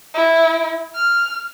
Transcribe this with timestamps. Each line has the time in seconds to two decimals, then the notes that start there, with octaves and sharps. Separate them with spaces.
0.14 E4
0.95 F6